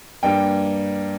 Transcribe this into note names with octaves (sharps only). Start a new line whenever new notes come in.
G2 G3 A#3 G5